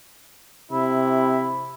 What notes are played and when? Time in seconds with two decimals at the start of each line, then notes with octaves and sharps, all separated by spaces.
0.71 C3 E4